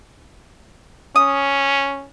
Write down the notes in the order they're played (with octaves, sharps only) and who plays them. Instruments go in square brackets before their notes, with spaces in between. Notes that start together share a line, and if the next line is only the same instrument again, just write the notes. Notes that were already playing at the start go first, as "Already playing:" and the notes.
[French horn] C#4 [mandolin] D#6